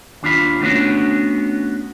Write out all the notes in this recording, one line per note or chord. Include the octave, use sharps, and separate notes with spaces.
D#2 D4 F4 B5
A3 B3 C#4 D4 F#4